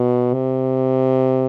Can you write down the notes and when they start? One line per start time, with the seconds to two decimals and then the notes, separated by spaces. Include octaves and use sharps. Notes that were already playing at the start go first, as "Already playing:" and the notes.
Already playing: B2
0.34 C3